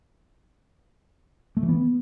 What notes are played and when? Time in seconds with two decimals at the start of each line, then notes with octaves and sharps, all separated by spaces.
1.57 A3
1.63 E3
1.69 B3